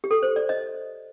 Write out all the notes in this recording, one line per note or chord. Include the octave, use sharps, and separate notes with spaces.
G4
A4
C5
D5
D#5